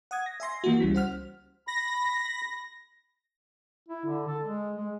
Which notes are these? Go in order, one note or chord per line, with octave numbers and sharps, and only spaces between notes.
F#5 D#6 G#6
A#6
E5 G#5 C6 A#6
E3 A#3 E4 F#4
C#2 G3 C#4 B6
C5 F#5 F6
B5 A#6
E4
D3
A4
G#3
G#3